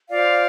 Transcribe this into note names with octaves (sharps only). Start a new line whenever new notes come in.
F4 C5 D5 F5